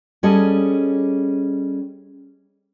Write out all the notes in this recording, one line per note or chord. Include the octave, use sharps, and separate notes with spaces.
G3 C#4 G#4 A4 D#5